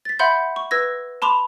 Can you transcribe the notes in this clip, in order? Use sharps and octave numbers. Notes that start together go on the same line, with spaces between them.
A6 B6
E5 F#5 B5 C6 G6
C#6
B4 E6 G#6 A#6
A5 B5 C6 D6 F7